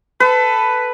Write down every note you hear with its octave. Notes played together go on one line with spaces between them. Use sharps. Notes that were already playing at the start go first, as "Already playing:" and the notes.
A4 B4